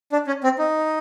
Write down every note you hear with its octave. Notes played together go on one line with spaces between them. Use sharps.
D4
C#4
C4
D#4